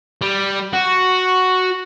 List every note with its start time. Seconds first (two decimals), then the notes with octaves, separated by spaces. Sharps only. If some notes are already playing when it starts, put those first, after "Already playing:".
0.21 G3
0.73 F#4